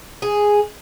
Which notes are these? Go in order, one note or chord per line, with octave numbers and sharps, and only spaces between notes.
G#4